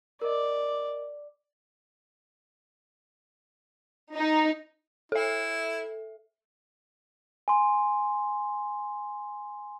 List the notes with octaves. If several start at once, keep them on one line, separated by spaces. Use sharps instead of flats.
A#4 D5 D#5
D#4
E4 A4 E5
G#5 C6